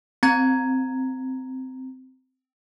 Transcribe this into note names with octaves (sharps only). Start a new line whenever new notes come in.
C4 A#5 G#6